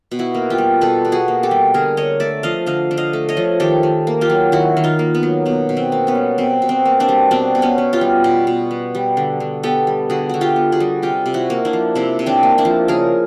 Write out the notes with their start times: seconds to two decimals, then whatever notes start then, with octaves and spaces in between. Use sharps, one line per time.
0.11 B2
0.19 E4 F#4
0.34 A#3
0.50 F4 G4
0.58 G3
0.81 B2 A4 B4
1.05 B2
1.12 F#4 G#4
1.28 A#3
1.43 G4 A4
1.51 G3
1.74 D3 G#4 A#4
1.97 D3 C#5 D#5
2.20 A3 D5 E5
2.43 F3 D#5 F5
2.66 D3 D#5 F5
2.91 D3
2.97 D#5 F5
3.13 A3
3.29 C#5 D#5
3.37 F3
3.60 D#3 G4 A4
3.83 D#3
4.07 A#3
4.21 F4 G4
4.30 F#3
4.52 D#3 E4 F#4
4.77 D#3
4.84 D#4 F4
4.99 A#3
5.15 B3
5.23 F#3
5.45 B2 B3
5.69 B2
5.77 C4
5.92 A#3
6.07 B3 C#4
6.15 G3
6.38 B2 C4
6.62 B2
6.69 C4
6.86 A#3
7.00 C4 D4
7.09 G3
7.31 B2 C4 D4
7.55 B2
7.62 B3 C#4
7.78 B3
7.93 F4 G4
8.01 G3
8.24 B2
8.47 B2
8.71 B3
8.95 G3
9.17 D3
9.40 D3
9.63 B3 G4 A4
9.87 G3
10.10 D3 F#4 G#4
10.29 D3 F#4
10.41 F4 G4
10.56 B3
10.72 F#4 G#4
10.80 G3
11.03 C3 F4 G4
11.26 C3
11.34 E4 F#4
11.50 A#3
11.65 D4 E4
11.73 F3
11.95 C3 D4 E4
12.19 C3
12.26 C4 D4
12.43 A#3
12.58 D4 E4
12.65 F3
12.88 C#3 G#4 A#4